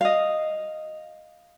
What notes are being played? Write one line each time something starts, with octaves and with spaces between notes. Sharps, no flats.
D#5 F5